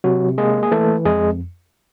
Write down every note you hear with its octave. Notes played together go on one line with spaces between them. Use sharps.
C3 F#3 F#4
G#3 A#3 G#4
G#4
E3 A3 A4
F2 G#3 G#4